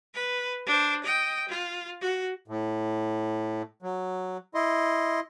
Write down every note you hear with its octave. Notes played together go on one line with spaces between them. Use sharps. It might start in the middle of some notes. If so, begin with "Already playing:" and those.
B4
D4 C5
D#5 G5
F4
F#4
A2
F#3
E4 D#5 C6